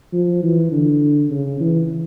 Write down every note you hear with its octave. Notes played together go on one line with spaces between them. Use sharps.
F3
E3
D3
C#3
E3